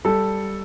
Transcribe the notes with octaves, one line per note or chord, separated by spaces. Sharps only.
G3 A4